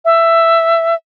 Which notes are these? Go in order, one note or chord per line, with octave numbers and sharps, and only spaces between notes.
E5